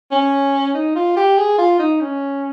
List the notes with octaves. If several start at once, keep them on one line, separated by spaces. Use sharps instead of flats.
C#4
D#4
F4
G4
G#4
F4
D#4
C#4